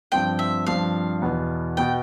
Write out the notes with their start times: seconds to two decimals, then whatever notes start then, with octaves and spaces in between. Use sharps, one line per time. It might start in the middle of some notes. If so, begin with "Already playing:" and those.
0.12 G2 F3 C4 G5
0.39 E5
0.67 G2 F3 C4 F5
1.22 E2 B2 B3
1.77 B2 B3 G5